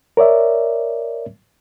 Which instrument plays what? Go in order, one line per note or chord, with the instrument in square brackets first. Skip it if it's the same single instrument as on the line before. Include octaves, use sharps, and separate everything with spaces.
[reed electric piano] A#4 C#5 D5 E5